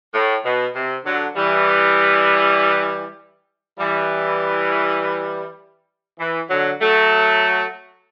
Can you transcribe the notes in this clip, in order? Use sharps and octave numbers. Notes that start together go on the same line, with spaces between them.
A2
B2
C3
D3 F#3
E3 G3
E3 G3
E3
D3 F#3
F#3 A3